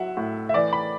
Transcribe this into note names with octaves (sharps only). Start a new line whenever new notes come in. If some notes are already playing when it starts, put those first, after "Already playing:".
Already playing: F#3 E5 F#5
A2
E5
E3 D5
B5